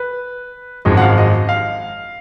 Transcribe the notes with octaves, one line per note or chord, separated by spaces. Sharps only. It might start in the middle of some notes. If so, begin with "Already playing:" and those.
Already playing: B4
G#1 F#2 F3 G#3 D#5
F#5
F5
D#5
F5